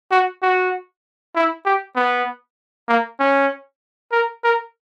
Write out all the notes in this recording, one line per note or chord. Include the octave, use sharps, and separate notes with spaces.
F#4
F#4
E4
G4
B3
A#3
C#4
A#4
A#4